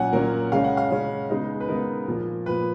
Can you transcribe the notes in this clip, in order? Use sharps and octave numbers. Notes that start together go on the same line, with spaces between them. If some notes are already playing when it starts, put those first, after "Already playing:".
Already playing: A#2 F#3 C#4 F#5 G#5
A#2 F#3 C#4 A#4
C#3 G#3 C#4 F5
F#5
F5
C#3 G#3 C#4
C#3 G#3 B3 D#4
B4
C#3 G#3 B3 D#4 A#4
A#2 F3 A#3
A#2 F3 A#3 B4